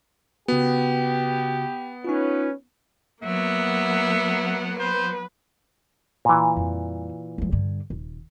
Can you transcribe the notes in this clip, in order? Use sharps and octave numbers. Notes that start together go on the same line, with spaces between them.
C#3 B3 F#4 G4
C#4 D#4 F4 B4
F#3 A#3 B3 E5 F#5
B4 C5
A#2 E3
F2 G3
F3 G#3
G2 D3
D#1